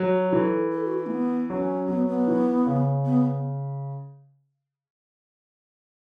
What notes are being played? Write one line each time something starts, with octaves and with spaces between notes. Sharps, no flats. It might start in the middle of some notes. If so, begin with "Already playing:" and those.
Already playing: F#3
F#4
E3 A4
A4
F#4
E4
A3
B3
F#3 C#4
F#3 B3
B3
E3
C#3
B3